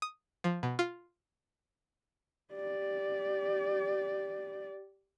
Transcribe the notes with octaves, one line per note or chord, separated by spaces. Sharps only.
D#6
F3
B2
F4
G4 D5